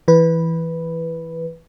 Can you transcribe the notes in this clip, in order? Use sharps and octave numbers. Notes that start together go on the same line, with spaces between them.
E3 B4